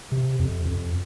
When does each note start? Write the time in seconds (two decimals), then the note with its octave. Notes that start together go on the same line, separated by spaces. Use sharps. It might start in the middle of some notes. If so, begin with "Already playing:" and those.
0.12 C3
0.40 F2
0.66 F2